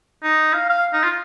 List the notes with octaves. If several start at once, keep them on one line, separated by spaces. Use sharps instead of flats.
D#4
F5
F5
D#4
F4